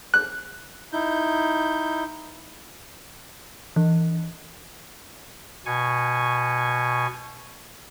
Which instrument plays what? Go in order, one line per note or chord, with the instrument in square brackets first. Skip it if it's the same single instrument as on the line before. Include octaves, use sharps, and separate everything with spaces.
[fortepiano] F#6
[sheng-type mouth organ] D#4 E4 G6
[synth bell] E3
[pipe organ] B2 G#5 C#6